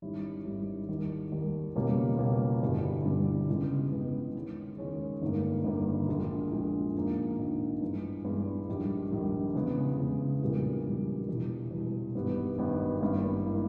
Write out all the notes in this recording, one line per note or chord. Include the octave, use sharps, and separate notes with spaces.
G#1 G#2 G3 C#4 E4
G#1 G#2 G3 C#4 E4
D#2 D#3 G3
D#2 D#3 G3
C#2 B2 G3 A#3 C#4
C#2 B2 G3 A#3 C#4
G1 G2 E3 G3
G1 G2 E3 G3
C#2 C#3 E3 G#3 B3
C#2 C#3 E3 G#3 B3
D#2 D#3 G#3 C#4
D#2 D#3 G#3 C#4
G1 G2 D#3 A#3
G1 G2 D#3 A#3
A#1 A#2 G#3
A#1 A#2 G#3
A#1 G#2 D#3 A#3
A#1 G#2 D#3 A#3
G2 E3 G#3
G2 E3 G#3
A#1 G#2 D#3 G3
A#1 G#2 D#3 G3
E2 C#3 G#3 B3
E2 C#3 G#3 B3
A#1 A#2 G3 B3 E4
A#1 A#2 G3 B3 E4
E2 B2 G3
E2 B2 G3
G#1 G2 G3 B3
G#1 G2 G3 B3
G#1 G2 D#3 A#3 E4
D#3 A#3 E4